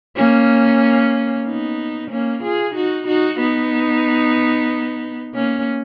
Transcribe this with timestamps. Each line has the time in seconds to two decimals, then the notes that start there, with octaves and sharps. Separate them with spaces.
0.16 A#3 C#4
1.45 B3 D#4
2.11 A#3 C#4
2.43 F4 G#4
2.75 D#4 F#4
3.07 D#4 F#4
3.39 B3 D#4
5.34 A#3 C#4